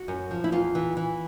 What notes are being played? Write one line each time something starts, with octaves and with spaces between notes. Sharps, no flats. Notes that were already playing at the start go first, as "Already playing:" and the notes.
Already playing: F#4
F#2
F3
E4
E2 F4
E3
E3